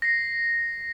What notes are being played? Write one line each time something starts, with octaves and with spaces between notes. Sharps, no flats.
A#6 C7